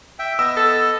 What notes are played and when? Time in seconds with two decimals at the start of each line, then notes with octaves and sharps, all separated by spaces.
0.19 E5 G5
0.39 B3 D#5 E6
0.57 A4